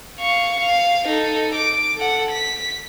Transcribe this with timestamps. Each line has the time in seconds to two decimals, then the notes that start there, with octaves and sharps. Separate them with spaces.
0.19 F5 C#6
0.60 F5
1.08 D#4 A4
1.55 D6
1.97 A4 F#5
2.31 B6